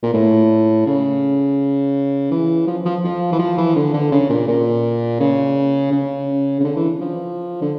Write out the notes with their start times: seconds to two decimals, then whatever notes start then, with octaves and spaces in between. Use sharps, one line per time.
0.03 A#2
0.14 A2
0.86 C#3
2.31 E3
2.67 F3
2.86 F3
3.04 F3
3.32 E3
3.39 F3
3.58 E3
3.76 D3
3.94 D3
4.12 C#3
4.30 A#2
4.48 A#2
5.20 C#3
5.92 C#3
6.60 C#3
6.64 D3
6.77 E3
7.01 F3
7.62 D3